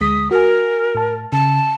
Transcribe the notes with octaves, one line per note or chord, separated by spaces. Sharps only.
D2 G#3 D#6 B6
F#4 A#4 G#5
A2 A5
C#3 A5